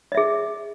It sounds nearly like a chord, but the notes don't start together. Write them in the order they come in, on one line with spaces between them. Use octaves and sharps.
D#5 E5 G#4